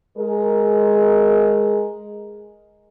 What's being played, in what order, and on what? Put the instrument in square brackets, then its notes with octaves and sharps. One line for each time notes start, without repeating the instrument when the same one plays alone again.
[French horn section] G#3 G#4 A#4